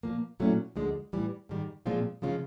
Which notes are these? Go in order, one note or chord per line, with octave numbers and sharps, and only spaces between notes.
A#2 F3 A#3
A#2 F#3 A3 C#4 E4
D2 D3 F3 G#3
A2 E3 G3
G#2 D#3 G3
A#2 F3 G#3 C4 F4
C#3 F3 G#3 C#4 F4